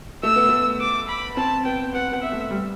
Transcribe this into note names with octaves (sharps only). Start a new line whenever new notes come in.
A3 E6
B3
A3
D6
B5
C4 A5
B3 G5
B3 F#5
B3
E5
A3
G3